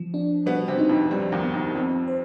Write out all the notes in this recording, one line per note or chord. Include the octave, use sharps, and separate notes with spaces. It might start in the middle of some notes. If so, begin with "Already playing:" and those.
Already playing: F3
D4
B2 G3 B3
C3 C4
D#4
F2 F3
G2 F3 G3
D#2 D#3
B3
D#2 D#3
F2 F3 C4
C5